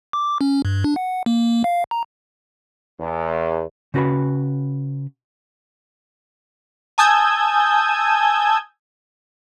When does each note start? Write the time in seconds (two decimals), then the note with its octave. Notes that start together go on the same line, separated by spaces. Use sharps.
0.13 D6
0.41 C#4
0.65 G2
0.84 D4
0.96 F#5
1.26 A#3
1.64 F5
1.91 A#5
2.99 E2
3.94 C#3 C#4 F#4 B4 B5
6.98 G#5 A5 D#6 E6 G6 G#6